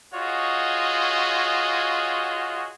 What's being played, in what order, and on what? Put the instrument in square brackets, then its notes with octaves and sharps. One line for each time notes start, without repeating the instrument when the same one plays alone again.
[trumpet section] F4 F#4 G#4 C#5 D#5